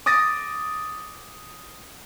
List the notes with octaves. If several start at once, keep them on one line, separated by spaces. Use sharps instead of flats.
D6 D#6 A6 A#6